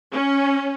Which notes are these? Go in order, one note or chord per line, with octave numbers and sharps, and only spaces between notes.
C#4